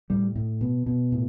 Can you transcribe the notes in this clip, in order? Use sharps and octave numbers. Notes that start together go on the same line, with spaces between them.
A2 G3
A2
B2
B2
A2